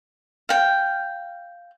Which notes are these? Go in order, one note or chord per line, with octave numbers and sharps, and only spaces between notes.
F5 G5